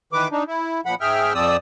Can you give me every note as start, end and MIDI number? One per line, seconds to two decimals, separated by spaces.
0.13 0.28 51
0.13 0.28 52
0.13 0.28 71
0.13 0.28 86
0.32 0.44 62
0.32 0.44 63
0.47 0.81 64
0.86 0.95 46
0.86 0.95 53
0.86 0.95 78
0.86 0.95 83
1.01 1.33 44
1.01 1.33 68
1.01 1.33 76
1.01 1.33 79
1.01 1.33 89
1.35 1.57 41
1.35 1.57 53
1.35 1.57 60
1.35 1.57 74
1.35 1.57 87
1.35 1.57 88